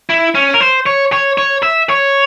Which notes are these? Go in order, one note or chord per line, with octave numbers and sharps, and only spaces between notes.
E4
C#4
A#4
C5
C#5
C#5
C#5
E5
C#5